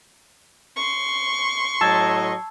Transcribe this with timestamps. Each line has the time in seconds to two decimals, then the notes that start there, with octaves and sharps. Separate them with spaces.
0.76 C6 C#6
1.81 A2 F#3 D#5 A5 E6 G#6